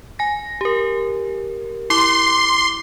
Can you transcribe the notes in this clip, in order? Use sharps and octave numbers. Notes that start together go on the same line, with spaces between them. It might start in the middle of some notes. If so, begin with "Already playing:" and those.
G#5 A#6
G4 A#4
E4 C6 D6